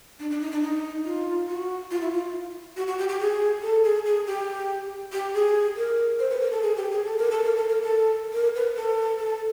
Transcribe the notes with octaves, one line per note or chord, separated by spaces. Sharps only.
D4
D4
D#4
D4
D#4
F4
F#4
F4
E4
F4
F#4
F#4
G4
G4
G#4
A4
G#4
G#4
G4
G4
G#4
A#4
C5
B4
A#4
A4
G#4
G4
G#4
A4
A#4
A4
A#4
A4
A#4
A4
A#4
B4
A4
A4